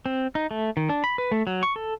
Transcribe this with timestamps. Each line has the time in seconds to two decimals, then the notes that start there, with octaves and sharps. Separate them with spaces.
0.06 C4
0.35 D#4
0.51 A3
0.77 D#3
0.89 D4
1.04 B5
1.18 B4
1.32 A3
1.47 F#3
1.63 C#6
1.76 A4